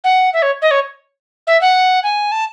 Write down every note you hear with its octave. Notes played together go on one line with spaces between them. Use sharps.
F#5
E5
C#5
D#5
C#5
E5
F#5
G#5
A5